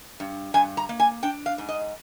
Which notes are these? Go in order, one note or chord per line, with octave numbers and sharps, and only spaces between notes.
G2
G2 G#5
A#5
A#3
G#5
D4 G5
F5
G#2
D#5